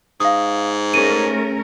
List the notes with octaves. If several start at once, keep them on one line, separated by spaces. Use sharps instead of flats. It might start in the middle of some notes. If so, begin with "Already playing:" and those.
G#2 F5 D#6
A3 C#4 G#4 A#4 D#7